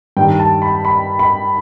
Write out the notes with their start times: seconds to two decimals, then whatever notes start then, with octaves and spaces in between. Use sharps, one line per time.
0.17 G2 D#3 G3 G5
0.39 A5
0.62 B5
0.85 B5
1.19 B5